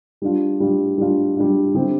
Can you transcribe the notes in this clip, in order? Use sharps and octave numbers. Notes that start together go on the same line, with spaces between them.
G3 D4 F4
G3 D4 F4
G3 D4 F4
G3 D4 F4
D3 G3 C4 E4 G4